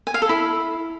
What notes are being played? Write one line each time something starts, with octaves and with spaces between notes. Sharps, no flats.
G#5
F5
A4
E4